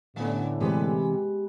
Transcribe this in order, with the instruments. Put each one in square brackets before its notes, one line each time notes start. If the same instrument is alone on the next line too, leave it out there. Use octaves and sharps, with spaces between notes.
[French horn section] A2 D3 [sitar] G3 C#4 [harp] B3 G#5
[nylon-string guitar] C3 E3 [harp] G#3 [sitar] G4 B4